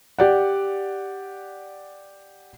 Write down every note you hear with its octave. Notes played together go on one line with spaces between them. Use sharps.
G4 D5 F#5